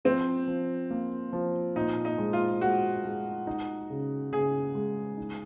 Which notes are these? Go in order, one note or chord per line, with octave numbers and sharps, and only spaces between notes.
F3 C4
F3
A#3
F3
A#2 D#4
D#4
G#3
F4
G#3 F#4
G#3
D#4
C#3
C#3 G#4
G#3
D#4